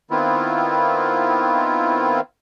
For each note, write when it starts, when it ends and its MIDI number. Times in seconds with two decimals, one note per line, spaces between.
0.11 2.21 51
0.11 2.21 59
0.11 2.21 60
0.11 2.21 64
0.11 2.21 65